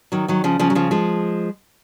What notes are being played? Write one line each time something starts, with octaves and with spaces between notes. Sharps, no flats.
D#3 F#3
D#3 F#3
C#3 F3
C#3 F3
F#3
C#3 F3
F3 G#3